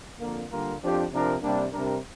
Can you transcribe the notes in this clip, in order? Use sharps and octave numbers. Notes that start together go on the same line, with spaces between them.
F2 D3 A#3
D3 G3 A#3 F4 A#4
F2 F3 D4 G4 C5
C3 F3 D4 A#4
C3 G3 A#3 D4
C3 G3 D4 A#4